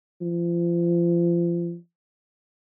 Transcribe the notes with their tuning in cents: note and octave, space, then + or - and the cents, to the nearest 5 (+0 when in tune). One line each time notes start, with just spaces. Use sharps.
F3 -30